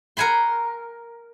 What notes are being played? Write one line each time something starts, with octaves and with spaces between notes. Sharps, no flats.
A#4 F#5 G#5 B5 C6